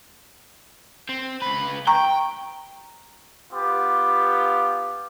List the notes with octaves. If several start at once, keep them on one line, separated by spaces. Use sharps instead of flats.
C4
C#2 B4
G5 A#5 C#6
B3 F4 G4